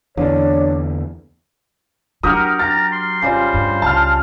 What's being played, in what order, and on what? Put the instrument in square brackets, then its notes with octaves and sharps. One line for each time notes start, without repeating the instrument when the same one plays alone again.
[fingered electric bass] E2 D3 [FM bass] E3 [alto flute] D4 [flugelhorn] C#5
[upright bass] F#3 D4 [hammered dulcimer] F#4 G4 A#4 [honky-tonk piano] D#6 F6
[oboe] A#5 [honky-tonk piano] A6
[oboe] C6
[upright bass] G#1 [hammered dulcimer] C#3 G3 F4 [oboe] C5
[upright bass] G2
[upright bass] C#2 [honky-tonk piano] A5 F6